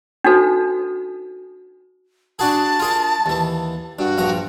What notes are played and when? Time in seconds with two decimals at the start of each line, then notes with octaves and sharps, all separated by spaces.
0.24 D4 D#4 F#4 A4 B4
2.39 D4 F#4 G#4 A5
2.80 F4 G#4 A#4
3.26 D#2 E3
3.99 G2 F#4
4.18 A#1 G2 A#5